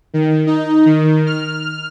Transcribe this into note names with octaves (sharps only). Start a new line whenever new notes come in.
D#3
D#4
D#3
F6